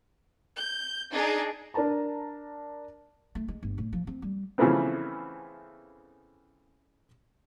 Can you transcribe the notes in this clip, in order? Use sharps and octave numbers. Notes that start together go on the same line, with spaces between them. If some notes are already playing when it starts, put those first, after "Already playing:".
G6
D4 D#4 G#4
D4 A#4 D5 A5 A#5
A3
G#3
G1
A2
F3
C4
G3
C#3 E3 F3 A3 B3 C4